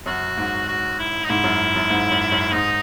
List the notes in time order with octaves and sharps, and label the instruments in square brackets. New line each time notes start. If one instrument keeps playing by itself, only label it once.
[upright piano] F#2 [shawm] F#4
[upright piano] G#2
[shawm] F#4
E4
D#4
[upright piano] G#2 [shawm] E4
[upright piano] F#2
F#2
G#2
F#2
F#2
[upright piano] G#2 [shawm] D#4